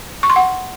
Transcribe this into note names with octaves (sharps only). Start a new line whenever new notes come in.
C#6
C6
F#5